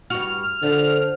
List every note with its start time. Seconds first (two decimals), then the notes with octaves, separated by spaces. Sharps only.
0.10 G2 F#4 F6
0.63 D3 F3